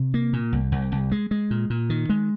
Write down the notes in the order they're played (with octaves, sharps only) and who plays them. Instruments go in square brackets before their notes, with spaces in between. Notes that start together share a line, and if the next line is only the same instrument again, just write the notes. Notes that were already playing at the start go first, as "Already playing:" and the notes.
Already playing: [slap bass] C3
A#3
A#2
C2
C2
C2
G#3
G#3
A#2
A#2
D#3
G#3